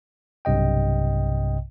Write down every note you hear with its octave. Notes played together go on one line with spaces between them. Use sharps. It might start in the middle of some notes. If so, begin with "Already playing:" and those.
B1 G2 C3 D#5 G5